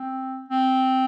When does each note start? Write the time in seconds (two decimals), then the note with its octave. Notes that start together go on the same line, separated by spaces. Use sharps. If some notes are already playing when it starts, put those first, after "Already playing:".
Already playing: C4
0.49 C4